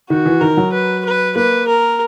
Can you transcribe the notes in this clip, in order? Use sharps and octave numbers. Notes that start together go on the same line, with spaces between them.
D#3 F#4
E3
D#3 A#4
F#3
B4
B4
A#3 B4
A#4